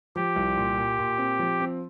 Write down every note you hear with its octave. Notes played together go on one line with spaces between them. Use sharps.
F3 G4
C2
A#2
A#2
A#2
C4
F3
C4